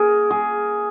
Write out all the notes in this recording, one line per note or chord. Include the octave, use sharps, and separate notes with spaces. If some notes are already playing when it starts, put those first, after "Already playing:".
Already playing: A#3 G#4 A#4
G#4